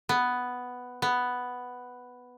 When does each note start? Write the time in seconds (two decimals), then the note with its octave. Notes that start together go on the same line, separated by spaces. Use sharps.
0.09 B3
1.02 B3